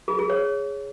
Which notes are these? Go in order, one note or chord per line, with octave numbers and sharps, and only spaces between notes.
G#4
G#4
C#5